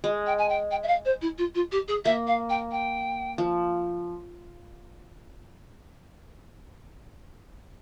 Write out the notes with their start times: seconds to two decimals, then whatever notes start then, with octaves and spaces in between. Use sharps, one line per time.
0.04 G#3
0.27 G5
0.38 G#5
0.49 G5
0.71 G5
0.83 E5
0.88 F5
1.05 C5
1.22 E4
1.38 F4
1.55 F4
1.72 G4
1.88 G#4
2.05 A#3 E5
2.27 F5
2.50 G5
2.72 G5
3.38 F3